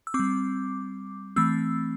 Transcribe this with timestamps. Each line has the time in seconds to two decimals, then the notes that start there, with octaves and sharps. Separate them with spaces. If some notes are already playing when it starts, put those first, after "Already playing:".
0.07 E6
0.14 C4 D6
0.19 G3
1.36 E3 A3 C4 E6